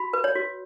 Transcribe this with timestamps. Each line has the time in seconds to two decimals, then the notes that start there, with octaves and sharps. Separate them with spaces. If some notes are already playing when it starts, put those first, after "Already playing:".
Already playing: F#4 B5
0.13 B4
0.24 C#5
0.35 F#4